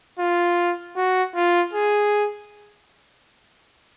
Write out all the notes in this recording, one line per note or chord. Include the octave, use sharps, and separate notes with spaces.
F4
F#4
F4
G#4